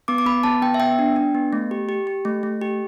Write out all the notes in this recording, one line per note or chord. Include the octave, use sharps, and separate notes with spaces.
B3 D6
D6
B3 B5
B3 A5
B3 G5
E5
B3 G5
D4
D4
B3
A3
G4
G4
G4
A3
A3
G4